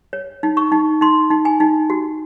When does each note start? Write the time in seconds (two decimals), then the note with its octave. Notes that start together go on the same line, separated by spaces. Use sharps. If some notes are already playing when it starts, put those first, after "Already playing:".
0.13 C#5
0.43 D#4
0.57 C#6
0.72 D#4
1.01 D#4 C6
1.31 D#4
1.45 G#5
1.60 D#4
1.90 F#4